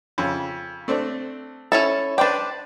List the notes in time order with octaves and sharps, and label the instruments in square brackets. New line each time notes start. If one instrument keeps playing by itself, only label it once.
[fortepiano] F2 C#3
A3 C4 D4
[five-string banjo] C#4 E4 A4
[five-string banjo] D4 G5 [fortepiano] B4 C5 D5